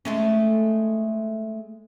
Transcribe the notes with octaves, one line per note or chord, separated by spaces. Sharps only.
G#3 A3 C#4